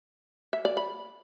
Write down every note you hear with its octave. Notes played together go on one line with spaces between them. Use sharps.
E5
D5
B5